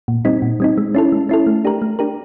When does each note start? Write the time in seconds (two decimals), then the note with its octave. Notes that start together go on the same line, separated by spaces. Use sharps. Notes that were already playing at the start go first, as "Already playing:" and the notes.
0.08 A#2
0.25 G3 C4 D#4
0.42 A#2
0.60 G3 C4 D#4
0.78 G#3
0.95 C#4 E4 A4
1.12 G#3
1.29 C#4 E4 A4
1.47 A3
1.65 D4 G4 A#4
1.82 A3
1.99 D4 G4 A#4